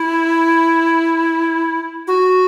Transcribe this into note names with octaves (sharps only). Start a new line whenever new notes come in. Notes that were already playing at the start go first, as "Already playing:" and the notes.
Already playing: E4
F#4